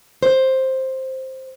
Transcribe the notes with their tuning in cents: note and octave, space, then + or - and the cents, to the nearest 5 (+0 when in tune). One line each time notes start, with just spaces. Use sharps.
C5 +5